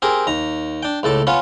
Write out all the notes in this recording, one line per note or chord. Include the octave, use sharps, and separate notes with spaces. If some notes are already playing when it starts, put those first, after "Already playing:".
C4 G4 G#4 A#4
D#2 A#5
D4 G5
C#2 A2 A4 D6
B3 C#4 F4 C#5